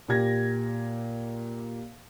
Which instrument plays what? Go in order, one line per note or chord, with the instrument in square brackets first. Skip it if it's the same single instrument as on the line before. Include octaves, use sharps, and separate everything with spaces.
[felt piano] A#2 G4 G#6 A#6